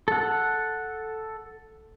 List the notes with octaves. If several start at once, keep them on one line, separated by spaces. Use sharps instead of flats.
A4 F#5